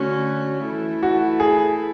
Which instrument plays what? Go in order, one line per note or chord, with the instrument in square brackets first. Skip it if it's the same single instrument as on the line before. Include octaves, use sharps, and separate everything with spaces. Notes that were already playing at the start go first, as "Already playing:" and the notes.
Already playing: [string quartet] D3 A3 C#4 F#4 C#5
E3 A3 E4 A4
[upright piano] F#4
G#4